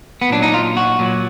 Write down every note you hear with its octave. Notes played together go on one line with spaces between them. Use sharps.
B3
A#2 F#3 D4
D#4
F4
F#4
A#2 F#3